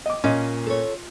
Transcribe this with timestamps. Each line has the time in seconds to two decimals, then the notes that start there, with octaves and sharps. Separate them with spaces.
0.06 D#5 D6
0.24 A#2 C#4 D#5 F5
0.67 A4 C#5